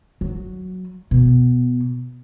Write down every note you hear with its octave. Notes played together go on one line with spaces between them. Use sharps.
F#3
B2